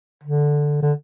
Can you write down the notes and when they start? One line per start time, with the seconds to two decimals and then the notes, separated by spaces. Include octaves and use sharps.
0.23 D3
0.82 D3